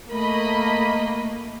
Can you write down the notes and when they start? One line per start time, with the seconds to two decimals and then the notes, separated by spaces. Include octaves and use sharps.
0.10 A3 A#3 A#4 D#5 B5